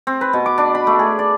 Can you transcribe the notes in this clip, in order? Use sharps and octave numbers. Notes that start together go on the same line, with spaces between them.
C4
B4
B2
D6
D4
B5
A3
G#4
D5